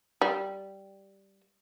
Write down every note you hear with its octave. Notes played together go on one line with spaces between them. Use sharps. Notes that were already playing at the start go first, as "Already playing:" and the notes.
G3